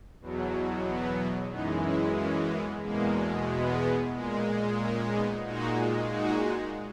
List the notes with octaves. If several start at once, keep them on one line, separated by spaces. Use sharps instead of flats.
E2 B2 F#3
B3
F#2 E3 G#3 B3 D#4
C#4 E4
A#3 C#4
B3
E2 B2 G#3 A#3
B3
A#2 G#3
A#3 C#4
B3 D#4
A#2 G#3 D#4 F#4
D#4 F#4